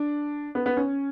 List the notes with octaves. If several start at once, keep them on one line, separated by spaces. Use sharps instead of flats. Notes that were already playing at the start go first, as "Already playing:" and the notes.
Already playing: D4
B3
B3
C#4